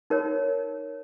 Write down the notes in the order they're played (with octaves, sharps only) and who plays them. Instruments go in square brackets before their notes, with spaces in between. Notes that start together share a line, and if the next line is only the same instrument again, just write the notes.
[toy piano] D#4 A#4 C#5